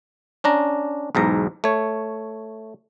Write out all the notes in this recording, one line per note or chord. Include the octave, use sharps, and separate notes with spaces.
C#4 D4 A#5
B1 E2 G#2 A#5
A3 C#5